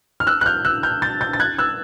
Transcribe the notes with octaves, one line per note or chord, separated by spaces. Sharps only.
F6
E6 F#6
F#6
F6 G6
E6 F#6
F6 G6
G6 A6
G6 A6
A6
F#6 G#6
E6 F#6